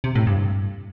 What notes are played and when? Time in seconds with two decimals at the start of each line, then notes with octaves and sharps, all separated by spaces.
0.04 C3
0.15 A2
0.27 G2